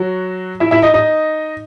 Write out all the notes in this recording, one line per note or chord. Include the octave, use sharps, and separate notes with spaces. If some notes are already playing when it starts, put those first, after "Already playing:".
Already playing: F#3 F#4
E4 E5
E4 E5
D#4 D#5
D#4 D#5